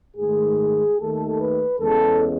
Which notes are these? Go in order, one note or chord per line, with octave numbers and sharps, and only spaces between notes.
G#2 D#3 A3 G#4
D#2 D#3 A3 A4
B4
E2 C#3 G#3 A4